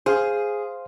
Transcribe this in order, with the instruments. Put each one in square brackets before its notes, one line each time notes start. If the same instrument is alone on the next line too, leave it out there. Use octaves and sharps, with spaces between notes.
[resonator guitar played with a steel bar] G#4 [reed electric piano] C5 F5 C6